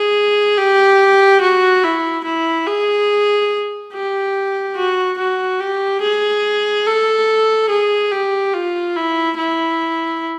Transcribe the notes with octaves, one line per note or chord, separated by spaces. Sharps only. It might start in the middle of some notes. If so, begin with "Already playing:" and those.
Already playing: G#4
G4
F#4
E4
E4
G#4
G4
F#4
F#4
G4
G#4
A4
G#4
G4
F4
E4
E4